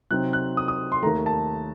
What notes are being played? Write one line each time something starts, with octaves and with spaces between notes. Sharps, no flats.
C3 F#3 C4 D#4 F#6
F#6
D#6
D#6
C6
D#2 D#3 A3 A#5
A5